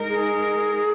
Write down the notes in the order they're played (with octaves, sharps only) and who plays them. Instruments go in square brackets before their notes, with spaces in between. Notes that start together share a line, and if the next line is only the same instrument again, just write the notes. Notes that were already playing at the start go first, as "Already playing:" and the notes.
Already playing: [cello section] G#3 D#4 A#4
[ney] G#4